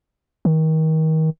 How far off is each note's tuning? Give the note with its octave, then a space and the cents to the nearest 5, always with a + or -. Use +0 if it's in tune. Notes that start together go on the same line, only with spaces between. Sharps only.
D#3 +30